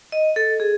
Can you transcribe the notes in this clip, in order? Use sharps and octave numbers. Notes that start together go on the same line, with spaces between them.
D#5
A4
G#4